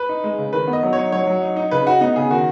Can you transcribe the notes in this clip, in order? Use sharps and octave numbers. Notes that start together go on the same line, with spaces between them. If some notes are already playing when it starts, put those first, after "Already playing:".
Already playing: B4
D#4
G#3
C#3
D#3 B4
B3
D#5
F#3
D#4 C#5
F#3 C#5
F#3
D#4
D#4
C#3 B4
D#4 F#4
B3 D#4
C#3 G#4
D#3 F#4